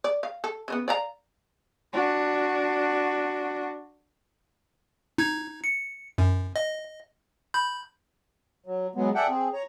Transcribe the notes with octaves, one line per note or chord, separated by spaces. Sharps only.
D5
F5
A4
C#3 A3 B3
D5 F5 A#5
D4 F#4
D#4 G#6
C#7
F#2
D#5
B5 G6
F#3
F#3 G#3 B3
G#4 A4 D5 E5 F#5 G5
C4 G#4
C#5 A#5